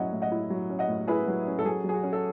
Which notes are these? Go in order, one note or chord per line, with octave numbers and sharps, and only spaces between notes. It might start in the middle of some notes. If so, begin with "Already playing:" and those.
Already playing: A2 F#3 C#4 E4 C#5 D#5 F#5
A2
D#5 F#5
E4
F#3
C#4
D#5 F#5
A2
E4 G#4 B4
F#3
C#4
A4
F#3 G#4
F#3
G#4
F#4
C#4
A4